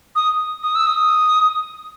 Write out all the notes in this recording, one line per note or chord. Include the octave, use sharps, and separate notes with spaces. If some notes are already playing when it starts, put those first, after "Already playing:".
D#6
D#6
E6
D#6